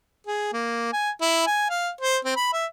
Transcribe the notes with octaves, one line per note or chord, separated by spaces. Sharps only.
G#4
A#3
G#5
E4
G#5
F5
C5
C4
B5
E5